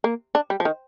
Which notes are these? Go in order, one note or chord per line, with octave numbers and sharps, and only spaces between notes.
A#3
D4
G3
F3
D#3